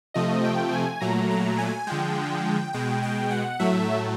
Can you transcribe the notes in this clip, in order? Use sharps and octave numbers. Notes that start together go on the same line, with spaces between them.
C3 F3 A3 D#5
G5
G#5
A#2 F#3 A3 A#5
A#5
G#5
D3 F3 G#3 G5
B2 G#3 G5
G5
F#5
A2 F#3 A3 E5